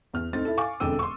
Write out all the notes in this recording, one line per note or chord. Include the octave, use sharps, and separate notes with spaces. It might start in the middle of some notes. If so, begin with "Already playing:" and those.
E2 F6
D2 C4 D#4 A6
E4 A4
F5 G#5 C#6 D6
E1 F2 D3 G5 E6 D#7
C6 C#6